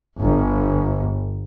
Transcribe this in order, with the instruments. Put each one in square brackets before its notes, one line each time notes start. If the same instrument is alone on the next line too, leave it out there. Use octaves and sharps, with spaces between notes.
[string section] G1